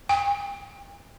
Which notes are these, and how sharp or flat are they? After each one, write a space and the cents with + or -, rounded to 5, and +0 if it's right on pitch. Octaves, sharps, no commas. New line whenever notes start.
G5 +35